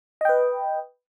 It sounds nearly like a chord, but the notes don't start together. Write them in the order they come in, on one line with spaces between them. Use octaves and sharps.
D#5 G5 B4